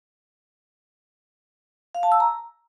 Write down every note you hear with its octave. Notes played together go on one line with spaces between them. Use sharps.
F5
A5
E6
A#5